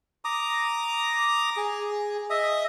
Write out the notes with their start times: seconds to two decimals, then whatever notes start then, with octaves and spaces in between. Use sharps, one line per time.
0.25 A#5 D6 D#6
1.57 G#4
2.30 D#5 E5 D#6